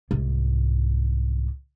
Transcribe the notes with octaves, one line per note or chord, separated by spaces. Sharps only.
C2 G#2